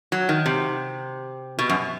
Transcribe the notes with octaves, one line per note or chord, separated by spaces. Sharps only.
F#3
D#3
C3
B2
F#2